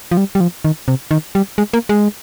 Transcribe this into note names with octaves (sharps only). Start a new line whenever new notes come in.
F3
G3
G3
F3
D#3
C3
D#3
G3
G#3
A#3
G#3